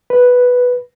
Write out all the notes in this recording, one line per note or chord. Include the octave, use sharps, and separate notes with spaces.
B4